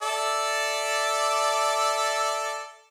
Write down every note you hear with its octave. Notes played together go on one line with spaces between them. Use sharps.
A4 D5 E5